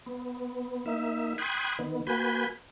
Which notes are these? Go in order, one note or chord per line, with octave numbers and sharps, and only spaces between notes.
B3
A#3 D#4 E5
G5 B5 C6 D#6 F#6 G#6
D#3 B3
A#3 F#4 B4 G#5 B5 G6